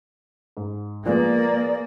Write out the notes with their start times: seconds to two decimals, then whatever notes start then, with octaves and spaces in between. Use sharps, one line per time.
0.57 G#2
1.06 F3 G#3 A#3 B3 D5